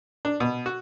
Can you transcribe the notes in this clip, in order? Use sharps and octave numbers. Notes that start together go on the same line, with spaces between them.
D4
B2
F#4